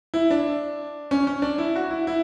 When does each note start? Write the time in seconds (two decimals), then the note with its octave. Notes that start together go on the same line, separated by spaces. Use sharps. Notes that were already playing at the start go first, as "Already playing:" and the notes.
0.14 E4
0.31 D4
1.11 C#4
1.27 C#4
1.42 D4
1.58 E4
1.76 F#4
1.90 E4
2.07 E4